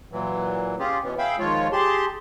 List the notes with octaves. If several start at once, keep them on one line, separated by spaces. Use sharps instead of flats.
A#2 E3 F#3
C#4 F4 G4 G#4
B2 E3 B3 C#4
G#4 E5 F5 G5 B5
D#2 F3 G#3 F4 C#5
G4 G#4 A5 C6